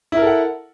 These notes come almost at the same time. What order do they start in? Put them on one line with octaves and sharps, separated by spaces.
E4 A#4 A4 F#5